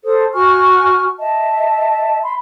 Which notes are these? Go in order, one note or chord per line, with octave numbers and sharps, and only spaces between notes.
A4 C5 D#6
F#4 G#5 C#6 F6
D#5 E5 A5
B5 C6